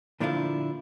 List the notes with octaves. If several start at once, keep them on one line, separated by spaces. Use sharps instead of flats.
A#2 D3 F3 D4 E4 F4